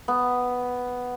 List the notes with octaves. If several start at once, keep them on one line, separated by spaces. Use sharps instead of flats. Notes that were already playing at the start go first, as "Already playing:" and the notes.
B3